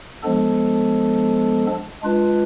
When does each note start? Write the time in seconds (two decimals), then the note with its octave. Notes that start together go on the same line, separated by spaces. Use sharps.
0.23 F3 G#3 B3 D4 A4
2.02 G#3 D4 F4 B4